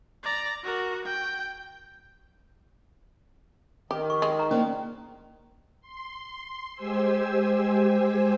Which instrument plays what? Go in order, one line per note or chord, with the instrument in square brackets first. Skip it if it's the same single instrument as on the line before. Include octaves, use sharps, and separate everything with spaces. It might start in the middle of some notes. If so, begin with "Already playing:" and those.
[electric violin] D5 A#5
F#4 A#4
G5
[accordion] D#3 [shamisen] G4
[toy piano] C#6
[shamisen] G#3
[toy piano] A#5
[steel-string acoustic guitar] F3 A#3 D4 [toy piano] C#4
[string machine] C6
G#3 G4 C5 G#5 E6